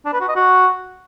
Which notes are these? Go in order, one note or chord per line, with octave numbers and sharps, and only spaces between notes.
D4
B4
F#4
D#5
F#4